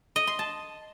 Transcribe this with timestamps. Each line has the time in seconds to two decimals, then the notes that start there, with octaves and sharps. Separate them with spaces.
0.16 D#5
0.27 C6
0.39 A5